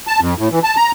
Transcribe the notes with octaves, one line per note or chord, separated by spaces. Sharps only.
A5
F2
A2
E3
A5
A#5